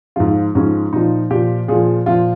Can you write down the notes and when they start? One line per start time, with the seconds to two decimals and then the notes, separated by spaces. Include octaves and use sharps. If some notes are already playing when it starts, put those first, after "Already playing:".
0.16 G#2 F3 F4
0.55 G#2 F3 C#4
0.93 A#2 F3 D#4
1.30 A#2 F3 G4
1.68 A#2 F3 G#4
2.06 A#2 F3 F4